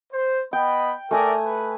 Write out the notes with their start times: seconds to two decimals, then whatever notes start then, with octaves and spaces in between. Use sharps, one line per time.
0.12 C5
0.53 B3 D#5 G5 B5
1.11 A3 A#4 D5 E5 G#5 D#6
1.44 B4